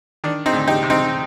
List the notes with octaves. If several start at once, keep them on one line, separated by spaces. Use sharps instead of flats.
D#3 D4
C4 D#4
D2
D#4 G4
C3
C4 D#4